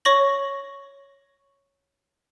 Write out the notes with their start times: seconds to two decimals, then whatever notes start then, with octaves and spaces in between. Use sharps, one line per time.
0.05 C#5 C#6 A#6 F#7